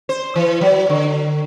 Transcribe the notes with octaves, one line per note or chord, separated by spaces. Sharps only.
C5
E3
F#3
D3